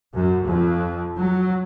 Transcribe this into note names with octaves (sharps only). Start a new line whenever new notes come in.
F#2
F2
F#3